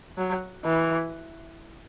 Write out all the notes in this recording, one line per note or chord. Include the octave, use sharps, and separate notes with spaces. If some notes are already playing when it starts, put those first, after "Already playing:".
F#3
E3